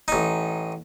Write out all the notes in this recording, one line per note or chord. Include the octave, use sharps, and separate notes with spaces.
A1 D#4